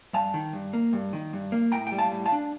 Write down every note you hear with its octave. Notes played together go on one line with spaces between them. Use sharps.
G2 F5 A5
D#3
G2
A#3
G2
D#3
G2
A#3
A2 G5 A#5
G3 G5
F5 A5
A2
F5 A5
D4